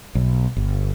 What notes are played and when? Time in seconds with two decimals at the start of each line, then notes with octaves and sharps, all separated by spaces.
0.15 B1
0.56 G1